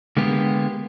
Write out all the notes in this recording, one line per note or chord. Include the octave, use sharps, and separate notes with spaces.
D3 G#3 A#3 B3 G4